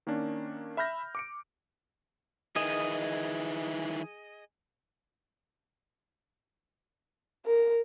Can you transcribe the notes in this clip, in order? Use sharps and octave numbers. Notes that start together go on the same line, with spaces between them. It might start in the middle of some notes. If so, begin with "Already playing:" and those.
D#3 A#3 C#4 D4
E5 B5 F6 G6 A#6
D6 C#7 D7
D#3 E3 G#4 D#5
A#4